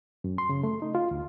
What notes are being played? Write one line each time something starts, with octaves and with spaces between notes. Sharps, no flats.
F#2
C6
C#3
A3
D#4
F4
D2